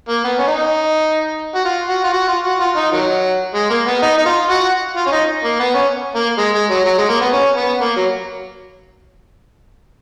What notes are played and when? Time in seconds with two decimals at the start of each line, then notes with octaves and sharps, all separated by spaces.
0.09 A#3
0.24 B3
0.38 C#4
0.47 D#4
1.55 F#4
1.65 F4
1.89 F#4
2.04 F4
2.13 F#4
2.28 F4
2.45 F#4
2.60 F4
2.76 D#4
2.92 D#3 F#3
3.55 G#3
3.70 A#3
3.87 B3
4.02 D#4
4.18 D#4
4.26 F4
4.50 F#4
4.96 F4
5.07 C#4
5.12 D#4
5.44 A#3
5.60 B3
5.75 C#4
6.15 A#3
6.38 G#3
6.54 G#3
6.70 F#3
6.85 F#3
6.98 G#3
7.09 A#3
7.21 B3
7.33 C#4
7.57 B3
7.81 A#3
7.96 F#3